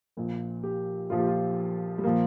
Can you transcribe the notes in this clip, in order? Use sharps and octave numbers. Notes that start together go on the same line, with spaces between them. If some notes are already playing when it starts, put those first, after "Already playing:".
A#1 A#2 F3
G4
A#1 A#2 F3 F4
G4
F4
G3
A#2 F3 A#3